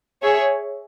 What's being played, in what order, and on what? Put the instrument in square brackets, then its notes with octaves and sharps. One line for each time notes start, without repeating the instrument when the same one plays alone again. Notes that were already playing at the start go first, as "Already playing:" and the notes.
[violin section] G#4 C#5 E5